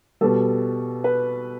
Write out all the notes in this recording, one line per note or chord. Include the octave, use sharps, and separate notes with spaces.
B2 G3 A4
B4